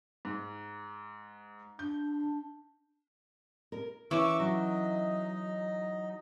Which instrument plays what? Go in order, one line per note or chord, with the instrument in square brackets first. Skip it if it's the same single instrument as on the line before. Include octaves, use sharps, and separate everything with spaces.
[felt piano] G#2
[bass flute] D4 [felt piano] G6
[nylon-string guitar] A#4
[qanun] E3 C#4 [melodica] C#6 D6 E6
[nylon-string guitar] F#3 [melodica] D#4 D#5